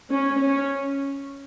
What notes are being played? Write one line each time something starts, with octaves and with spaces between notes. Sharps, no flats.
C#4
C#4